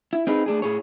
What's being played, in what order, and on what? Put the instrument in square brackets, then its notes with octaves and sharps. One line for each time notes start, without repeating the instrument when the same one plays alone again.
[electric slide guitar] E4
C4 D#4 G#4 B4
A3 D4 G#4
A2 G#4 C#5